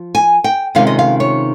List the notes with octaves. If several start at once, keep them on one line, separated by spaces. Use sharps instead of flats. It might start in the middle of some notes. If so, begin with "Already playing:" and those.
Already playing: F3
G#5
G5
C3 D#3 G#3 C#4 F4 F5
D#5
F5
C#5